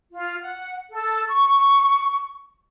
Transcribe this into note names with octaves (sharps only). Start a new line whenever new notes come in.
F4
F#5
A4
C#6